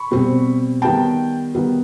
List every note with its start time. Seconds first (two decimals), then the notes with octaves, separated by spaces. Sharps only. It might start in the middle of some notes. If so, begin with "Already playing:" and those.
Already playing: B5 C#6
0.11 B2 G3 C4
0.82 D#3 G3 B3 G5 A5
1.55 D#3 G3 B3